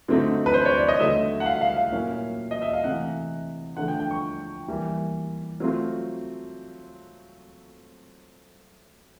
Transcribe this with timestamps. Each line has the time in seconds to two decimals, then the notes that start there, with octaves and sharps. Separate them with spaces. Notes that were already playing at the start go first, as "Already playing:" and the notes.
0.08 D3 F#3 A3 C4 D#4
0.46 B4
0.54 C5
0.65 C#5
0.77 D5
0.88 D#5
1.00 D3 F#3 A3 E5
1.40 F#5
1.46 F5
1.61 F5
1.77 F5
1.92 A#2 F#3 A#3 C#4 E4
2.51 D#5
2.62 E5
2.73 F5
2.84 C3 E3 A3 F#5
3.76 D3 F3 A3 D4 F4 F#5
3.88 G5
4.00 G5
4.11 C#6
4.68 E3 G3 A#3
5.60 F#3 A3 C4 F4